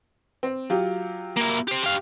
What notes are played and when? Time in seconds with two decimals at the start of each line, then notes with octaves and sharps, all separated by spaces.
0.43 C4
0.70 F#3 F4 G4
1.36 A#3 E4
1.67 G4 C5
1.84 G4 F5